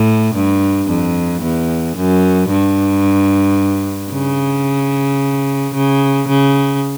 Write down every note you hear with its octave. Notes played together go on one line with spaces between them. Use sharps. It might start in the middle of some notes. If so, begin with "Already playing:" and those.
Already playing: A2
G2
F2
E2
F#2
G2
C#3
C#3
C#3